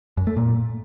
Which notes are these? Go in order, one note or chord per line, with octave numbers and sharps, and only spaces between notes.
F#2
A3
A#2